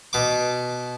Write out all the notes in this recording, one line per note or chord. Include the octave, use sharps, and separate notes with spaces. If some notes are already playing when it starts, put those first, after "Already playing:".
B2 D6